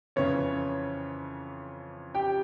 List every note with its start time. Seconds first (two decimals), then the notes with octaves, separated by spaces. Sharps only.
0.16 F2 C#3 E3 C#4 C#5
2.15 G4 G5